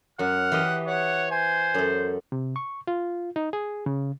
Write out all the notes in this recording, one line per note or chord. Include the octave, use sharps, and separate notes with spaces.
F#2 F#5 F6
E3 G4 D#5
C#5 F#5
C5 G#5
F#2 A4
C3
C#6
F4
D#4
G#4
C#3